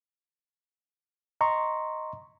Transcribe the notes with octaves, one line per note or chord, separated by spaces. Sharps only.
D#5 A#5 C6 C#6